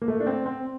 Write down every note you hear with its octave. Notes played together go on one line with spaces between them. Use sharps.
A#3
A3
D4
C4
C4